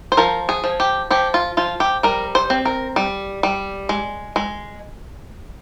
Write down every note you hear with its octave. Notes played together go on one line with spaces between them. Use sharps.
C5
F3 A#4
G#4
F3
G4
F3 G4
F4
F3 F4
G4
G3 A#4
C5
C4
A#4
G3
G3
G#3
G#3